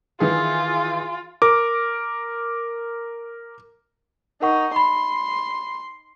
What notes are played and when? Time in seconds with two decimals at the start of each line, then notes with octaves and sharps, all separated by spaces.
0.20 D#3 E3 F4 G#4
1.42 A#4 D6
4.42 D#4 A#4 F#5 C#6
4.76 B5 C6